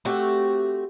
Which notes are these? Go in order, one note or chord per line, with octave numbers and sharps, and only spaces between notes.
A3 C4 F#4 G4